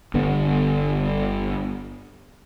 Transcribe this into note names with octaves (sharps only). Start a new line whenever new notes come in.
G1 D3 B3